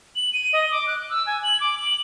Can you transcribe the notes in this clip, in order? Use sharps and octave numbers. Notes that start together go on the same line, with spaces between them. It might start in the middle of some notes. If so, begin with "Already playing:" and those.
F#7
D#7
D#5
D6
F#6
E6
G#5
F#7
D6
F#7